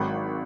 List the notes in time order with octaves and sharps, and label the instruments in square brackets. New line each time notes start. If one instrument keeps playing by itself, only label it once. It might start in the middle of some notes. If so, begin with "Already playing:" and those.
Already playing: [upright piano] G#1 G#2 D#3 F#3 B5